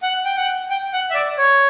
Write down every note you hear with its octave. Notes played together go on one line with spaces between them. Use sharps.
F#5
G5
F#5
G5
F#5
E5
D5
C#5